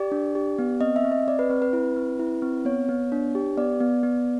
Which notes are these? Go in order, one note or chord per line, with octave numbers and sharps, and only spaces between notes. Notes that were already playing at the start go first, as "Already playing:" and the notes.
Already playing: G4 D5
D4
G4
B3
C4 D#5
E5
C4
D#5
C4 D5
B4
C4 B4
B4
E4
C4
E4
C4
B3 C#5
B3
D4
G4
B3 D5
B3
B3